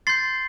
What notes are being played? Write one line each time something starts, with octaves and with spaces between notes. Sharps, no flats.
C6 G6 A6 C7